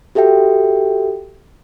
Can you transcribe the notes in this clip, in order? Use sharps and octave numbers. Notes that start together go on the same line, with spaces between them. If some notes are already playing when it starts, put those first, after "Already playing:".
F#4 G4 A4 E5 G5